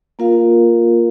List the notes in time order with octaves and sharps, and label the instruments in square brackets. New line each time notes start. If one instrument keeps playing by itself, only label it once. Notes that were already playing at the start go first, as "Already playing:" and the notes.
[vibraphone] A#3 F4 A#4 F5